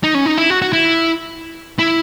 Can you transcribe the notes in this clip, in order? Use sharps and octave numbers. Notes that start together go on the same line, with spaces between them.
D#4
C#4
D#4
E4
F#4
F#4
E4
E4